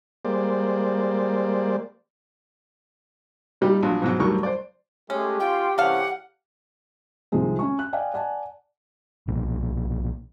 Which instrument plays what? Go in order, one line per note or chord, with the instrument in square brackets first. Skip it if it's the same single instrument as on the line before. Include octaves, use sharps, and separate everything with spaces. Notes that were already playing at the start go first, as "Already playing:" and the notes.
[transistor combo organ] G3 G#3 A#3 C5 D5
[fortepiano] A#2 G3 D#4 G4
A#1 F#3 D4
G#2 B2 F#3
D2 D#3 F#3 G3 A#4 C#6
C5 D5
[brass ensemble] G#3 A3 [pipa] C#4 [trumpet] G4
[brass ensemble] F4 [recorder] G5
[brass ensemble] C3 E3 C#4 [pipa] G3 A4 F5 [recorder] F#5
[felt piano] C2 C3 D#3 F3 G#3 C4
C#4 G#5 C#6
F#6
D5 D#5 F5 G5 G#5
D5 F#5 G#5 A5
[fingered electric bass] B1 A#2